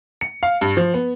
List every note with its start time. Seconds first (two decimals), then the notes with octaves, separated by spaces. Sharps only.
0.21 C#7
0.43 F5
0.61 G2
0.77 F3
0.94 B3